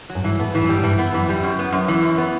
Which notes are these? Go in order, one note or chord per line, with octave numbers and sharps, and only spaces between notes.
F#3
F#2
G2 E3
A2 B3
A2 E3
F#2
G2 G3
A2
G2 E3
B3
F#2 E3
G3
F#2
B3
F#2
E3
F#2
B3